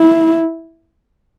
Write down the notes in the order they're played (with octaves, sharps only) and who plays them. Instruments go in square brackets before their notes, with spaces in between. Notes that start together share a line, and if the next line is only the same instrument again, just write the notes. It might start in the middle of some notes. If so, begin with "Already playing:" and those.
Already playing: [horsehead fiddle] E4